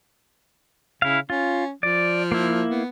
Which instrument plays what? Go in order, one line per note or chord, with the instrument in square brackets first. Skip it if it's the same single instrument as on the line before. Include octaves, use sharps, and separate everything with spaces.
[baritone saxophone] C#3 [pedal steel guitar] E4 F5
[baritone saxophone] C#4 [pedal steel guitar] F4
[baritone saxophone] F3 [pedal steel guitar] D5
[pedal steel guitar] A#3 E4
[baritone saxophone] B3